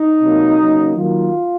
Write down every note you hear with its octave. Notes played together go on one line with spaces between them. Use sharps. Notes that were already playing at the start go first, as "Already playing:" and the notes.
Already playing: D#4
C3 F#3 A#3
C#3 F#3 A#3
D#3 F#3 A#3 F4